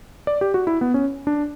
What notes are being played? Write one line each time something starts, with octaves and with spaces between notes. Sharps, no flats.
D5
G4
F#4
E4
B3
C#4
D4